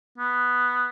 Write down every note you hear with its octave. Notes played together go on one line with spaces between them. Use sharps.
B3